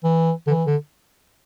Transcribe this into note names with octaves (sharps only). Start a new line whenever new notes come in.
E3
D3
E3
D3